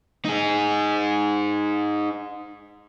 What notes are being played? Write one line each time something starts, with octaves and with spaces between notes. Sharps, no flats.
D#4 G#4